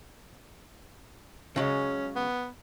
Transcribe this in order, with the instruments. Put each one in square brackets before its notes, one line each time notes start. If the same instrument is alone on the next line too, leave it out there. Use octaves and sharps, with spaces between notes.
[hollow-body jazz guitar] C#3 F#3 G#3 [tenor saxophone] C#4
[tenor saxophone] B3